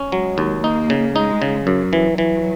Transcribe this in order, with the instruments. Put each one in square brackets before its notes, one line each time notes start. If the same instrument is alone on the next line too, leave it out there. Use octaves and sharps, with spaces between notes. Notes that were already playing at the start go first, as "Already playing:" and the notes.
Already playing: [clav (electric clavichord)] C#4
[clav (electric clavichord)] F#3 [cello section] G#3
[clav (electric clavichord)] D#2
[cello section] A#3 [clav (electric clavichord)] D#4
[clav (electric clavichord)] C#3
[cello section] G#3 [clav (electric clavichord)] D#4
[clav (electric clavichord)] C#3
[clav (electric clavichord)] F#2 [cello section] F#3
[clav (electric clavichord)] E3
E3